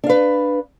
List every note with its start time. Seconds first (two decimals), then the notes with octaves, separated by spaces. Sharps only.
0.04 D4
0.06 F5
0.09 B4